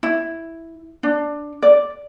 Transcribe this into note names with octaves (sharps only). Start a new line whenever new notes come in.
E4
D4
D5